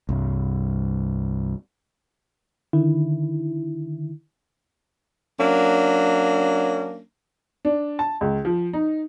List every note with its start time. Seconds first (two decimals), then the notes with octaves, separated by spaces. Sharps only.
0.09 C2 G2
2.73 D3 D#3 E4
5.39 F#3 A#3 C#4 D4
7.65 D4
7.99 A5
8.21 C#2
8.45 F3
8.73 D#4